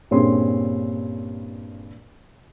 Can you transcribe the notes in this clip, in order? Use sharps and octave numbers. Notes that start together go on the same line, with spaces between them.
G2 A#2 C4 C#4 G#4 C6